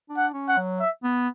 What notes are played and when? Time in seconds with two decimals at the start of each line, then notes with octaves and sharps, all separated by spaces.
0.09 D4
0.17 F#5
0.33 C#4
0.48 F#5
0.57 F#3
0.80 E5
1.04 B3